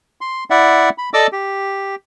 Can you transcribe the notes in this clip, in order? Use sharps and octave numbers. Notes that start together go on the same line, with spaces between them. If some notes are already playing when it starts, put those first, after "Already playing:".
C6
E4 D5 E5 F#5
B5
A4 D5 D#5 D6 E6
G4